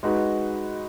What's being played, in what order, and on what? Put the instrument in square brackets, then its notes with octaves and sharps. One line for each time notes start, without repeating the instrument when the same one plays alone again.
[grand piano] G#3 D#4 F#4 B4